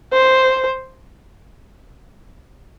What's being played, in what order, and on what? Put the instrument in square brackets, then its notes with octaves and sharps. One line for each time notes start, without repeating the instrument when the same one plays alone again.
[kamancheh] C5